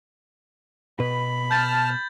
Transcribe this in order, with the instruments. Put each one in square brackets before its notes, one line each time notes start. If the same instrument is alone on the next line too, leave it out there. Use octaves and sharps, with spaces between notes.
[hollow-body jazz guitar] B2 B4 [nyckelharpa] B5
[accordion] A5 F6 [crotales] G6 A6